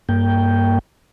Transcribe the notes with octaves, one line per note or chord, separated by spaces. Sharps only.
G2 A#3 G5